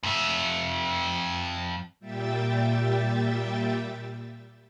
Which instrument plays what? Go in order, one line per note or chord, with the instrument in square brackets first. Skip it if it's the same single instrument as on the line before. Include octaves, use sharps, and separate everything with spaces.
[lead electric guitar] F2 E5
[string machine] A#2 G3 E5 G5 A6